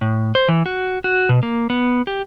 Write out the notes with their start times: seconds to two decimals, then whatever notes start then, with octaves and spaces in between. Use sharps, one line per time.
0.01 A2
0.35 C5
0.48 E3
0.66 F#4
1.04 F#4
1.29 B2
1.43 A#3
1.70 B3
2.07 G4